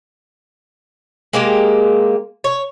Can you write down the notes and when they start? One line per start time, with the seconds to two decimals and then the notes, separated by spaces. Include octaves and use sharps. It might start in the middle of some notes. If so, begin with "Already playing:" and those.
1.33 G#3 A#3 G4 A#4
2.44 C#5